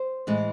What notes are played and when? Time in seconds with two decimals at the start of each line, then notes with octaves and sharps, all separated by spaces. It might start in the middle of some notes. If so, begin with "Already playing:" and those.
Already playing: C5
0.27 A2 E3 G#3